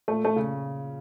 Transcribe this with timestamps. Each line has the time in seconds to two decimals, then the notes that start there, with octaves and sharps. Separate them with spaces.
0.08 A#2 A3
0.25 A3
0.36 C#3